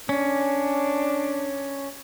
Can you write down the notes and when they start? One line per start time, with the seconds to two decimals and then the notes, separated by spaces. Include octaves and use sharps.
0.09 C#4 D4